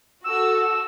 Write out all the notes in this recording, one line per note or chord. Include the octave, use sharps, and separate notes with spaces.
F#4 A4 E6